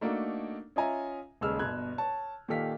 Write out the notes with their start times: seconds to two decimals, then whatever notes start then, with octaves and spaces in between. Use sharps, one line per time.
0.01 A3 A#3 D4 D#4 F#4 A4
0.76 C#4 F4 D#5 E5 G#5 A#5
1.41 D#1 C#3 G#3 E6 F6
1.59 G1 B2 F#6 G#6
1.98 C#5 A5
2.48 A#2 D#3 G4 A4 F5 B6